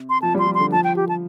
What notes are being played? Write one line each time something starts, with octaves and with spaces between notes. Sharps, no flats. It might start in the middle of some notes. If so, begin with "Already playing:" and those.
Already playing: C3
C6
F3 A5
G3 C6
F3
C6
D3
F3 A5
G5
G4
A5